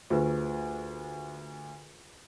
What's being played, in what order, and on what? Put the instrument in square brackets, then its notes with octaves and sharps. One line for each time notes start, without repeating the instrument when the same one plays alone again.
[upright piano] D2 [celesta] F4 G#4 B4